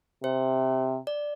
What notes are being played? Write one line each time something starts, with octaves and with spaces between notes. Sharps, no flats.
C3 C5
D5